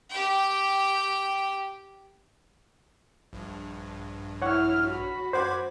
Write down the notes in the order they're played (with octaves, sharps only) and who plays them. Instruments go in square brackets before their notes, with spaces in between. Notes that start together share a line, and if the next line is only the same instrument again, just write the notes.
[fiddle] G4 G5
[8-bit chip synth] A#1 G2
[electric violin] E4 F6 [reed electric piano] C#5 F#5 C#6
[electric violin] F#4 B5
[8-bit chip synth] F#2 D6 G#6 [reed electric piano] C5 F#5